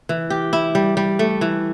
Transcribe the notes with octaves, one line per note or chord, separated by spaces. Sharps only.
E3
G4
E4
G3
G3
A3
E3